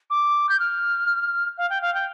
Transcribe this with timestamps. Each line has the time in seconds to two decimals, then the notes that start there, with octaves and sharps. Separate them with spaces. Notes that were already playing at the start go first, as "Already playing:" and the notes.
0.10 D6
0.49 G6
0.60 F6
1.58 F5
1.70 G5
1.82 F5
1.95 G5